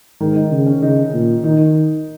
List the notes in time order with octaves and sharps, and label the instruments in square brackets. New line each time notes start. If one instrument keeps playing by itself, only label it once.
[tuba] G#2 [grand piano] D#3
[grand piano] D#4
[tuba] C#3
[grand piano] C#4
[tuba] C#3 [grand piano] D#4
[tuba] A#2
[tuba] D#3 [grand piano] D#4